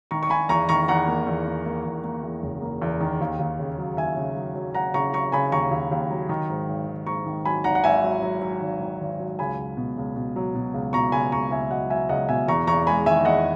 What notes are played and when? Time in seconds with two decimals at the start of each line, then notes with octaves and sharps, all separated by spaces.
0.11 D#3 A#5 C#6
0.23 C#6
0.30 D#3 G#5 B5
0.49 E2 A#5 C#6
0.69 D#3 A#5 C#6
0.88 E2 F#5 A#5
1.08 A#3
1.27 E2
1.47 A#3
1.66 A#3
1.85 E2
2.04 A#3
2.23 E2
2.43 F#1
2.62 A#3
2.82 E2
3.00 D#3
3.21 D#2
3.39 D#2
3.59 C#3
3.78 F#3
3.97 D#2 E5 G#5
4.17 C#3
4.36 F#3
4.55 F#3
4.74 F#3 F#5 A#5
4.94 C#3 A#5 C#6
5.13 F#3 A#5 C#6
5.32 C#3 G#5 B5
5.52 D#2 A#5 C#6
5.71 D#2
5.91 D#2
6.10 F#3
6.29 D#3
6.49 G#2
6.68 G#1
6.88 G#1
7.06 G#2 A#5 C#6
7.26 D#3
7.45 F#3 G#5 B5
7.64 G#1 F#5 A#5
7.75 F#5
7.84 G#1 E5 G#5
8.04 F#3
8.23 F#3
8.42 F#3
8.61 G#1
8.80 D#3
9.01 G#1
9.20 F#3
9.39 C#2 G#5 B5
9.58 C#2
9.77 B2
9.97 C#2
10.16 B2
10.36 F#3
10.55 B2
10.74 C#2
10.93 B2 A#5 C#6
11.12 C#2 G#5 B5
11.32 C#2 A#5 C#6
11.51 C#2 E5 G#5
11.71 F#3 D#5 F#5
11.90 F#3 E5 G#5
12.09 C#2 D#5 F#5
12.29 B2 E5 G#5
12.48 E2 A#5 C#6
12.67 E2 A#5 C#6
12.87 G#3 G#5 B5
13.06 D#3 E5 G#5
13.25 E2 D#5 F#5